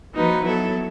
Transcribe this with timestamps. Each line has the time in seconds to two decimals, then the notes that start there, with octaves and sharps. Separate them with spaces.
0.14 F3 A#3 D#4 F#4 B4
0.44 F#3 B3 E4 A4